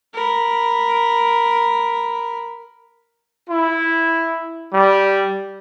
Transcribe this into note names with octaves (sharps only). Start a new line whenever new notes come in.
A#4 B5
E4
G3